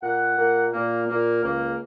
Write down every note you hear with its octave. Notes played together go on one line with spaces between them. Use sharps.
A#2 A#3 F#5
A#2 A#3
A#2 A#3
A#2 A#3
C#2 C#3 A#3